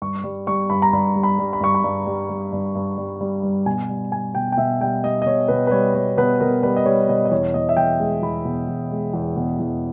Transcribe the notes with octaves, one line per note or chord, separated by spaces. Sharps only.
G2 C#6
G3
G3 C#6
G2 B5
A#5
G2 B5
G3
B5
G3
B5
G2 C#6
B5
G2
G3
G3
G2
G2
G3
G3
G2
B2 G#5
G3
G3 G#5
B2 G5
G5
B2 E5
G3 G5
G3 D#5
D#5
B2 C#5
B2 B4
B4
G3 C#5
G3 C#5
B2 B4
B2 A#4
G3 B4
D#5
G3 C#5
B2 D#5
D#5
E2 C#5
B2 D#5
E5
E2 G5
G#3
E2 B5
B2
E2
G#3
E2
B2
E2